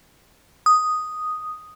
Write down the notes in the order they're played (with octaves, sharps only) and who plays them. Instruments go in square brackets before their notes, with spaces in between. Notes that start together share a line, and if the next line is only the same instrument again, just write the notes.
[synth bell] D#6